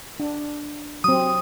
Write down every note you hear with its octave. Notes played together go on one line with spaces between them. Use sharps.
D4
F#3 C4 D#6